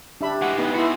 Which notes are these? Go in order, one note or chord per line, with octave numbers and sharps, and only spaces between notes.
D4 G4 E5 B5
E3 G#3 F#5
B3 D#4
E4 F#4 G#4 B5 C6